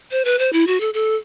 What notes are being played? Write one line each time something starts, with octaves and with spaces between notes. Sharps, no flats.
C5
B4
C5
E4
F#4
A4
A4